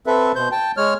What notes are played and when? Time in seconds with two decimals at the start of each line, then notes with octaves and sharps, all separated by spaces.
0.06 C4 A4 B4 E5
0.35 B2 C5 G6
0.52 G5 A5
0.77 G#3 C#5 F6